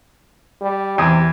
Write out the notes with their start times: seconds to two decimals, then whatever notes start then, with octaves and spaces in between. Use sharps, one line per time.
0.62 G3
0.98 E2 C3 D#6